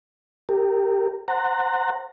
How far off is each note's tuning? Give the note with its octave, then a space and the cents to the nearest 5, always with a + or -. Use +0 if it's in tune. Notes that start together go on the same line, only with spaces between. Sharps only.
G4 +0 A#4 -25
C5 +0 F#5 +0 A#5 -25